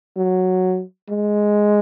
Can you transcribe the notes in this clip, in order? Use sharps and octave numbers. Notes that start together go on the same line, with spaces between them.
F#3
G#3